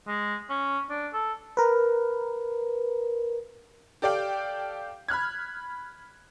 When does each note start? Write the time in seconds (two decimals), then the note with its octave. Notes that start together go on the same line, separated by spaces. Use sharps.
0.07 G#3
0.50 C#4
0.90 D4
1.13 A4
1.57 A#4 B4
4.02 G4 A4 D5 F5 G5
5.08 B5 F6 F#6 G#6